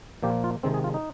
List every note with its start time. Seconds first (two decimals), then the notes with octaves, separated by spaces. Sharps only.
0.23 A#2 F3 A#3 G4
0.44 F4
0.63 C3 D#3 G#3 C4
0.74 G#4
0.84 F4
0.94 D#4